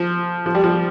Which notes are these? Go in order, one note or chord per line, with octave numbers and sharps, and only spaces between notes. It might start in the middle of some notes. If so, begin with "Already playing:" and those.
Already playing: F3
F3
G3
F3